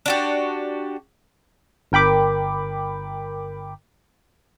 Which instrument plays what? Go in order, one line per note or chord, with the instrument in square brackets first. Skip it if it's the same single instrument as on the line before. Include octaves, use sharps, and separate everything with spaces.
[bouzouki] D4 F#4 G4
[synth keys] G1 A#4 G5 B5 D6